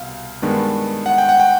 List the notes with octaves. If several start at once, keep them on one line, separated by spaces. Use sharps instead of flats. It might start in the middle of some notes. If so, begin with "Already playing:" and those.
Already playing: C2 B2 F5
G2 D#3 G#3 B3 D4
F#5
G5
F#5
G5